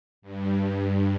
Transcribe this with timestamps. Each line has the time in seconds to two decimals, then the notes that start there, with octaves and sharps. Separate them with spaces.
0.22 G2